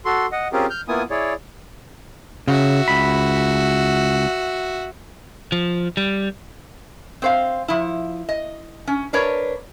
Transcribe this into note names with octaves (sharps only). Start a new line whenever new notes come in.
F#4 A4 C6
D#5 F#5
C4 C#4 F4 G4 G#4 A#4
F6 G6
A#3 B3 E4 F4 G#5 D#6
E4 G#4 C#5 D5
C#3 F#4 E5
C#2 B5
F3
G3
C4 C5 F5
F3 E4
D#5
C#4
D4 A#4 B4 C#5 D5